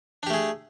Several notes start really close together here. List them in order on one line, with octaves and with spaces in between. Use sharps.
D4 G4 A3 G#4